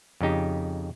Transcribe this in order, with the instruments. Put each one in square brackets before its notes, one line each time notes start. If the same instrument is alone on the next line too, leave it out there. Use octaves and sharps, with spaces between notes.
[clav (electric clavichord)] F2 C#3 D#4 G4